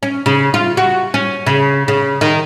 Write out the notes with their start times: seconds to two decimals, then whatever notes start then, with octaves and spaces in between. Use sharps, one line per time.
0.03 C#4
0.26 C#3
0.54 F4
0.77 F#4
1.14 C#4
1.46 C#3
1.88 C#3
2.21 D#3